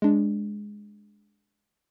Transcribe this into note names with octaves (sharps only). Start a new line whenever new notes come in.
G#3 D4